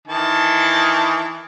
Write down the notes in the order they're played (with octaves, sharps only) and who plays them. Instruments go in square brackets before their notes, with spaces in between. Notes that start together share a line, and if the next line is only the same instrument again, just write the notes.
[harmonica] D#3 E3 A5